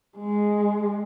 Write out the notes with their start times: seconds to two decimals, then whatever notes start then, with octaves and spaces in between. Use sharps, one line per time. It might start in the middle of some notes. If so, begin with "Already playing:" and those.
0.18 G#3